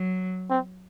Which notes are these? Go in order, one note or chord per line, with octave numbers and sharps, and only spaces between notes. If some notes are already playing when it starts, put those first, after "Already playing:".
Already playing: F#3
C4